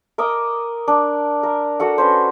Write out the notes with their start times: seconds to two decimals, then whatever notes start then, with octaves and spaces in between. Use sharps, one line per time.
0.18 A#4 D#5 D6 E6
0.88 D4
1.43 A#4
1.80 F#4 A4 F#5
1.98 C#4 B4 C5